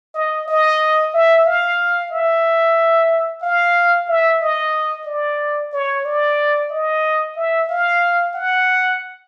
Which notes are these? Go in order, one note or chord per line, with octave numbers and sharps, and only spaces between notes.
D#5
D#5
E5
F5
E5
F5
E5
D#5
D5
C#5
D5
D#5
E5
F5
F#5